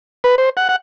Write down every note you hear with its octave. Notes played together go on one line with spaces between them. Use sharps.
B4
C5
F#5
F#5